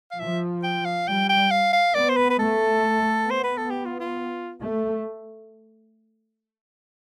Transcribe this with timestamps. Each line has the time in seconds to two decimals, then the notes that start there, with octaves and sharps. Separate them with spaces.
0.11 F5
0.19 F3 E5
0.63 G5
0.85 F5
1.07 G3 G5
1.29 G5
1.51 F5
1.73 F5
1.94 B3 D5
2.09 C5
2.17 B4
2.30 B4
2.39 A3 A4
3.26 B3 C5
3.44 B4
3.57 A4
3.70 G4
3.85 F4
4.00 F4
4.58 A3